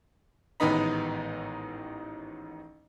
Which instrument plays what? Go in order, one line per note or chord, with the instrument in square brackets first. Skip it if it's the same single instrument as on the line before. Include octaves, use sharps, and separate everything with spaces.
[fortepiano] A1 G#2 D#3 B3 D#4 B5